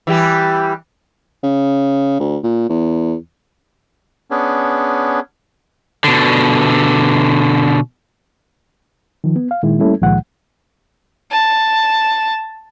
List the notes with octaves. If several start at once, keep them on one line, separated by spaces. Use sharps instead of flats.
E3 G3 G4
C#3
D2
A#2
E2
B3 C#4 D4 G#4
B2 D3
D#3 F3
B3
F5
A#2 D#3 G#3 E4
G3 A3 A#3 C#4 E4 A4
C#2 A#2 D#3 F3 G#3 F#5
A5